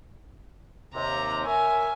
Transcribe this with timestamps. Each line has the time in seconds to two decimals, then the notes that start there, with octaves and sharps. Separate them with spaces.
0.94 D#2 C3 A#5
1.46 A#4 C#5 E5 G#5